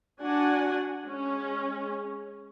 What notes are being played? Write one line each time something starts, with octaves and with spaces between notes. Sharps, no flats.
D4 F#4 F#5 G#5
G#3 C#4